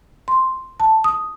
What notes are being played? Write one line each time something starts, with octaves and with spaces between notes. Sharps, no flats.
C6
A5
D#6